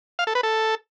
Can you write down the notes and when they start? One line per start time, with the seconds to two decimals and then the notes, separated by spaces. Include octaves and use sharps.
0.19 F5
0.27 A4
0.35 B4
0.43 A4